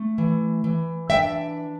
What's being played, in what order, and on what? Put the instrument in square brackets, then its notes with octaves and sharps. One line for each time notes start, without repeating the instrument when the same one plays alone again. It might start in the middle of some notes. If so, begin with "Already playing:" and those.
Already playing: [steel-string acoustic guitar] A3
E3
E3
D4 E5 G5